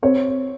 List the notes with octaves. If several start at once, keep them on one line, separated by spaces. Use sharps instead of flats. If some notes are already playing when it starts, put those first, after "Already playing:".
C4 C#5